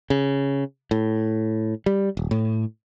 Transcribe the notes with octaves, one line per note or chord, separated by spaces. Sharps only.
C#3
A2
G3
D#1
A2